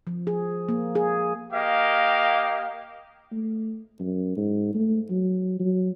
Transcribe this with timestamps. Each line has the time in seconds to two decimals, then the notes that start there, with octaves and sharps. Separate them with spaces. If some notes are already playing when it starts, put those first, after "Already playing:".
0.07 F3
0.27 G#4
0.69 A#3
0.95 G#4
1.53 A#3 G4 D#5 F5
3.32 A3
4.00 F#2
4.37 G#2
4.74 A3
5.10 F#3
5.60 F#3